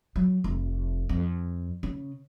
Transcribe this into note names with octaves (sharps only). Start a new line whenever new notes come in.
F#3
F1
F2
C#3